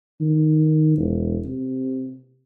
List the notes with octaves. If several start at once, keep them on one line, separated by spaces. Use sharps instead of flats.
D#3
E1
C3